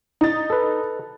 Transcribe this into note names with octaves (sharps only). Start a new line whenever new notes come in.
D#4 A6
A4 B4